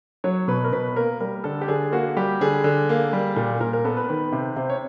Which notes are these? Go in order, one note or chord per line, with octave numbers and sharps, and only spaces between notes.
F#3 C#5
B2 B4
A#4
B2 B4
A#3 A#4
G3 A#4
D3 A4
G4
D3 G#4
A#3 F#4
G3 G4
D3 G#4
D3
A#3
G3
A#2
A#2 A#4
A#4
B3 A4
B4
D#3 B4
C3 C5
C3 C5
C#5